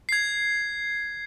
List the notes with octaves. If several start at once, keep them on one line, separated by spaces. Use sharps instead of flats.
G#6 C7